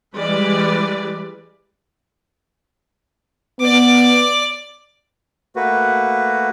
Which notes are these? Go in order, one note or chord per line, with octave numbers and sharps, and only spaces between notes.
E3 G3 G#3 B4 D5
B3 D5 D6
A3 A#3 F#4 B4